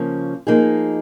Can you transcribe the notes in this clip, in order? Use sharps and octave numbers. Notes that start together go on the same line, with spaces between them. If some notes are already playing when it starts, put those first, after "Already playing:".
Already playing: C#3 F3 A#3 C#4
F3 A#3 D#4 G#4